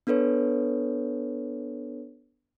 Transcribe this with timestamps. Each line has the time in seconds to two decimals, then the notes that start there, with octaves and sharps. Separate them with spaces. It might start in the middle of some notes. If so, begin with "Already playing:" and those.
0.07 B3 D4 A4 B4 C#5